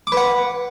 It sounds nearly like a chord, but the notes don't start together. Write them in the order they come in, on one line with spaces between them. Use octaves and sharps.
D6 B4 F#5